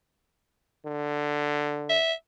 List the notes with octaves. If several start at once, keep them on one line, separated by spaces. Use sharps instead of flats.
D3
E5